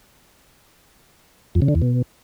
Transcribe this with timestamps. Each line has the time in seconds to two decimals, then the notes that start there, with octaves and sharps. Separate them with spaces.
1.55 F2
1.62 C#3
1.68 D3
1.75 E2
1.82 B2